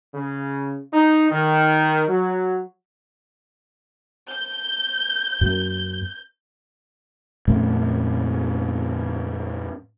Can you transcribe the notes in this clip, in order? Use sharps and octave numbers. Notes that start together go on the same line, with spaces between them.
C#3
D#4
D#3
F#3
G6
F#2 A#3
F2 A#2 A3 C#4